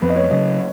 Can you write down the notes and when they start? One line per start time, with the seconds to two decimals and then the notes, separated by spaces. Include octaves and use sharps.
0.02 F2 F3 B3 B4
0.10 D#5
0.16 C#5
0.31 C#3 F#3 C#4 D#5